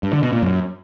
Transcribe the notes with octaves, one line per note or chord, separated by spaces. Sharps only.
G2
D3
B2
A#2
F#2